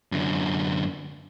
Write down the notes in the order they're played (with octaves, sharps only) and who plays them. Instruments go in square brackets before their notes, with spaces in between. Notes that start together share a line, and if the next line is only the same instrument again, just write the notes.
[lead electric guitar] F#2 D3